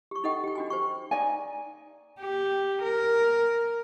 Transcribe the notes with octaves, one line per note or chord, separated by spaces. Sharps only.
G4 C#6
D#4 A4 D#5 F#5 G5
G4 G5
D4 F#4 G#5
C5 G5 C#6
D#4 D5 G#5
G4
A#4